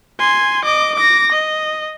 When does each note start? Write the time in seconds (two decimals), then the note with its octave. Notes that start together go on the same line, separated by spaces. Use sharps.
0.20 G#5 C6
0.65 D#5 D6
0.95 D6 A#6
1.32 D#5